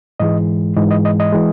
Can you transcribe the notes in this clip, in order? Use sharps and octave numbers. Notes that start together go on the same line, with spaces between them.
G#2 E3 G#3 D#5
G#2 E3 G#3 D#5
D#5
D#5
D#5
E3 G#3